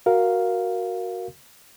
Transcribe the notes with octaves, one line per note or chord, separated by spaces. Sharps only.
F#4 A#4 F5